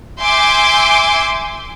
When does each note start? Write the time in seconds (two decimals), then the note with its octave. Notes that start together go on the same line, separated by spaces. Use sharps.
0.22 E5 G#5 C6 D6 G6